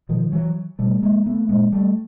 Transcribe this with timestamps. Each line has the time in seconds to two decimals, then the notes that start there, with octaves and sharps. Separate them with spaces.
0.09 B2 D#3 F3
0.32 E3 F#3
0.79 B2 G3 A3
1.03 G#3 A#3
1.26 A3 B3
1.49 A#2 G#3 A#3
1.72 G3 A3